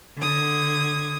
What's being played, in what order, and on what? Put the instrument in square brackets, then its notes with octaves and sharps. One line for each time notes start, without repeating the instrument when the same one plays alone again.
[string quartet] D3 D#6 G#6